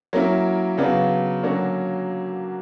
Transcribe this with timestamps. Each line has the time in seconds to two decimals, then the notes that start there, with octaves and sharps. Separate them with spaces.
0.13 F#3 A#3 C#4 E4 A#4
0.78 C#3 F#3 B3 D4
1.43 D3 F#3 A#3 C#4 F#4